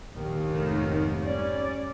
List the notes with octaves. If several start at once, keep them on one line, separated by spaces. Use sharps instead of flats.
A#1 D#2 D#3
F1 G#2 D#3 A3
G3 C#4 D5